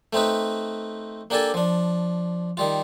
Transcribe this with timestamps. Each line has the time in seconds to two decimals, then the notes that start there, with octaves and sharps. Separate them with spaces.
0.13 A3 C4 D#4 B4
1.30 A#3 D4 G4 A4 G#5 A5
1.54 F3 D4
2.57 D#3 G3 F4